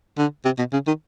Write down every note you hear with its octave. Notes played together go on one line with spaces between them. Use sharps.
D3
C3
B2
C#3
D#3